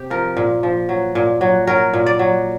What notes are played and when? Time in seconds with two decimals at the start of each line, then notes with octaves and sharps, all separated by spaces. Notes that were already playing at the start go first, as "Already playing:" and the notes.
Already playing: C3 G4
0.10 F3 A#4
0.37 A#2
0.63 F3
0.89 F#3
1.15 A#2
1.41 F#3
1.67 F#3 A#4
1.93 A#2
2.06 D5
2.19 F#3